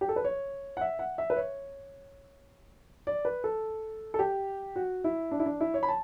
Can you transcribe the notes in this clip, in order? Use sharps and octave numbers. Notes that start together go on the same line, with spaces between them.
G4
A4
B4
C#5
F#5
E5
F#5
E5
B4
C#5
D5
B4
A4
A4
G4
F#4
E4
D4
E4
D4
E4
C#5
B5
A5